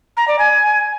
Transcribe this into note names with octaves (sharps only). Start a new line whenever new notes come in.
A#5
D5
G#5